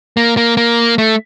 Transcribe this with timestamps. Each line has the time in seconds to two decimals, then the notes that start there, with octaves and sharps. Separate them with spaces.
0.17 A#3
0.37 A#3
0.57 A#3
0.98 A3